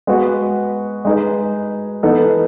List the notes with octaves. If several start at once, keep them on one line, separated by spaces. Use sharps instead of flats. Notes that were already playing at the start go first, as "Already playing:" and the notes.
G#3 B3 F#4 B4
G#3 D#4 G#4 B4
E3 B3 D#4 A4